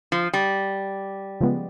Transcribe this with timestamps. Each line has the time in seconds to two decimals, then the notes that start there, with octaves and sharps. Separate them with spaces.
0.12 F3
0.33 G3
1.41 C#3 F3 G#3 B3